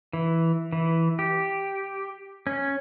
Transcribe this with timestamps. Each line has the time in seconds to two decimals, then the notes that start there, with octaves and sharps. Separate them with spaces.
0.13 E3
0.73 E3
1.19 G4
2.47 C#4